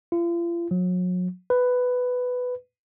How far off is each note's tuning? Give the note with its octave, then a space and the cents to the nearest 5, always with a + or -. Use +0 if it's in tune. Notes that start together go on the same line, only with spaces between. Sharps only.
F4 -40
F#3 -35
B4 +10